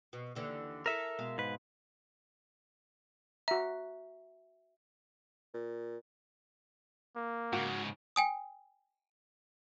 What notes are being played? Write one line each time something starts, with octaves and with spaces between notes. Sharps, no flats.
B2
D#2 D3 E3
E4 A4 A#4 E5
B2 G#3 F5
G#2 B4
F#4 E5 A#5
A#2
A#3
G#2 C#3 F#4
G5 G#5 D#6